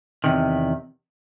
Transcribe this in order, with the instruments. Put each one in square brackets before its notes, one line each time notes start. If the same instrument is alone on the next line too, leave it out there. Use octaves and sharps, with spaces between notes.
[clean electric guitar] E2 C3 D#3